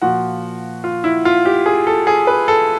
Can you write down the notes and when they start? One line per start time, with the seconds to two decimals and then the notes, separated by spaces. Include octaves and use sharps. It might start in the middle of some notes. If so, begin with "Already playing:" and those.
0.01 A#2 F3 F#4
0.84 F4
1.04 E4
1.25 F4
1.45 G4
1.66 G#4
1.87 A4
2.07 G#4
2.27 B4
2.48 A4